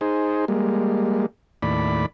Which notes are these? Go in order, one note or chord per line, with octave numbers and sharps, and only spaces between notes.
D#4 G#4 C5
G3 G#3 A#3
D#2 A2 D5 B5